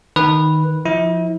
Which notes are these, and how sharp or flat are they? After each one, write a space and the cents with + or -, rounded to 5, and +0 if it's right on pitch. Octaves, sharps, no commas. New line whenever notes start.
D#3 +0 B4 -5
F3 +0 E4 -35